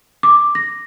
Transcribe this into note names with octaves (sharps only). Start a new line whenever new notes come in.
D6
A#6